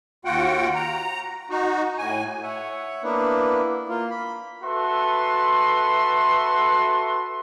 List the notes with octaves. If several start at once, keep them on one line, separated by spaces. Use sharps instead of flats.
D#2 F4 F#4 F#5 G5
A#5
D#4 F#4
A2 G#5
C#5 E5 F#5
A#3 B3 D4 E4 B4
A#3 F4
B5
F#4 A4 B4 E5 C6